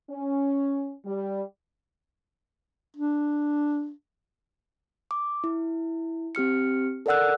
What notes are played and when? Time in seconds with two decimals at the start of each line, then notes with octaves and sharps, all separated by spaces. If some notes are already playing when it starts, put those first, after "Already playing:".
0.10 C#4
1.06 G3
2.96 D4
5.11 D6
5.44 E4
6.35 C4 G4 F6 C#7
7.06 A4 A#4 D5 F#5 E6 F#6